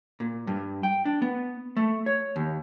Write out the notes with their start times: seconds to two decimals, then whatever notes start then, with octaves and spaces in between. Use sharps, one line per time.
0.20 A#2
0.47 G2
0.83 G5
1.05 D4
1.22 B3
1.77 A3
2.06 C#5
2.36 D#2